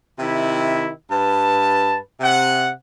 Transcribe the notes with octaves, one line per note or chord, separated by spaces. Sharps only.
C3 D#3 E4
G2 B4 A5
C3 F#5